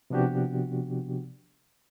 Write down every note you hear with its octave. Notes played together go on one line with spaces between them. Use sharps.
C3 F3 B3 D4 F#4 G4